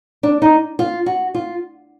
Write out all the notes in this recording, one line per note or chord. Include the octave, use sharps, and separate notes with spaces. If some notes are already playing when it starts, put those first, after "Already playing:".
D4
D#4
F4
F#4
F4